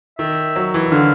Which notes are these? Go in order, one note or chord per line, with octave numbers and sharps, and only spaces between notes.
D#3 E5
F#3
E3
D3 F5